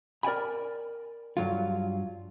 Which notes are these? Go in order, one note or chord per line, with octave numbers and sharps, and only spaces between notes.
A#4 D5 G5 G#5 B5
G2 F#3 F4